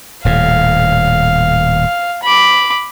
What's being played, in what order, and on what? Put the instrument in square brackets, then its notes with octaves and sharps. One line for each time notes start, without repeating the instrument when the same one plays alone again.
[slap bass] D#1 A2 [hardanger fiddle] F5
[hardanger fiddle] B5 D6